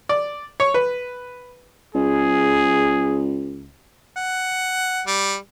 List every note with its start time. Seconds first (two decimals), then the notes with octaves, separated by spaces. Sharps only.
0.09 D5
0.60 C#5
0.74 B4
1.95 C#2 G#4
4.16 F#5
5.07 G3